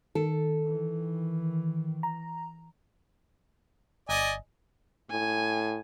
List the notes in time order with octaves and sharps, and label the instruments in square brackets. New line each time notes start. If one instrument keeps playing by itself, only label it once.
[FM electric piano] D#3 [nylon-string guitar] A4
[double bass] E3
[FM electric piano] A#5
[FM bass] G1 [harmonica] D5 D#5 G#5
[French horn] A2 [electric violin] G#5